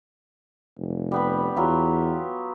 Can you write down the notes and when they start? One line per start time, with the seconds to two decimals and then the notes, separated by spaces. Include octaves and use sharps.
0.78 F1
1.12 G3 B3 B4
1.56 E2 F#3 F4 G4